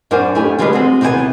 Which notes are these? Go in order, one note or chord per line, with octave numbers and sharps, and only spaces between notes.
F#2 D4 A#4 C5 F#5 G#5
F2 A3 C#4 E4 G4 G#5
D3 E3 F3 G3 G#3 B4
G#3 C4 F#4
D#2 C3 E3 B3 A4 G#5